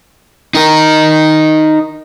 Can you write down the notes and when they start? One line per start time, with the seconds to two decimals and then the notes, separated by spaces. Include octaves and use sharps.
0.55 D#4 A#4